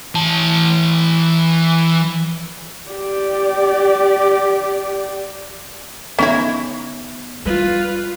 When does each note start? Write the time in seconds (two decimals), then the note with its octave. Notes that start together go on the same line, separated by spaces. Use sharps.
0.15 E3 A5
2.91 G4 D5
6.19 D3 B3 C#4 D#4 E4
7.46 G3 F4 B4